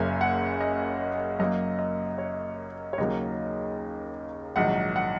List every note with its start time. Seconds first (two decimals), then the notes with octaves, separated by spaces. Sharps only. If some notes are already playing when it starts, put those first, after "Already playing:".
Already playing: F#1 F#2 C#3 A#3 G#5
0.21 F#5
0.61 D#5
1.39 F#2 F#3 A#3 D#5
1.79 D#5
2.18 C#5
2.93 C#5
2.98 D#2 C#3 F#3 A#3 D#5
4.56 A#1 G#2 D#3 F#3 F#5
4.96 F#5